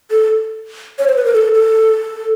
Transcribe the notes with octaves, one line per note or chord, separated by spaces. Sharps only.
A4
C#5
C5
B4
A#4
A4
A4